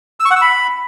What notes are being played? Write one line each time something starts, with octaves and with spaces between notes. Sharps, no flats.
E6
C#6
F#5
E6
B5